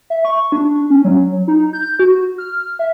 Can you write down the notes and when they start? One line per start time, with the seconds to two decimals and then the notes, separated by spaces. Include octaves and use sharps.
0.10 E5
0.25 C#6
0.52 D4
0.90 C#4
1.05 F#3
1.48 D#4
1.73 G6
1.99 F#4
2.38 F6
2.79 E5